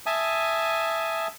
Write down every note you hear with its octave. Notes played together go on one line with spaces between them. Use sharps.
E5 G#5 A5 D#6